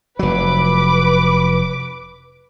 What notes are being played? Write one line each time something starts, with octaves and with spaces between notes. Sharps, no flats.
F1 F#3 B4 D6